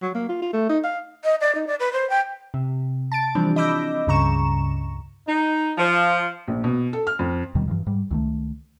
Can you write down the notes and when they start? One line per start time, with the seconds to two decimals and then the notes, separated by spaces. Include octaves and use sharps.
0.02 F#3
0.15 A#3
0.29 F4
0.42 F4
0.53 A3
0.69 D#4
0.84 F5
1.24 D#5
1.41 D5
1.55 D#4
1.67 D5
1.80 B4
1.93 C5
2.10 G5
2.54 C3
3.12 A5 A6 D7
3.35 E3 F3 G3 C4 D4
3.56 D#5 B5 D6 E6 G6 A#6
4.07 C#2 G2 C#3 A#5 C#6 E7
5.27 D#4
5.78 F3
6.48 A#1
6.64 B2
6.93 A4
7.07 F6
7.19 F2
7.55 D#2 B2 D#3 G3
7.68 G2 E3 F3
7.86 G#2 G3
8.11 C#2 D#3 A3